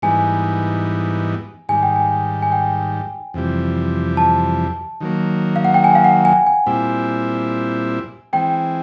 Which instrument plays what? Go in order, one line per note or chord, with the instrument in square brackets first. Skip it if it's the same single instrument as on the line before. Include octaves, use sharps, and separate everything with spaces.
[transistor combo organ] G#2 E3 G3 B3 D#4 [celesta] G#5
[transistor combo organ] G#2 D#3 G3 [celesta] G#5
[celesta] G5
G#5
G#5
G5
[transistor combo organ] F2 C3 E3 G3
[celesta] A5
[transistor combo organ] D#3 F#3 A#3
[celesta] F5
F#5
G5
G#5
F5
F#5
G#5
G#5
[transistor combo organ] A#2 G3 C4 E4
[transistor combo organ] E3 G#3 C4 [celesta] G5